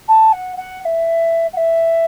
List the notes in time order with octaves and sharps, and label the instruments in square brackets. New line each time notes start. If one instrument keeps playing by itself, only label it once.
[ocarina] A5
F#5
F#5
F#5
E5
F#5
E5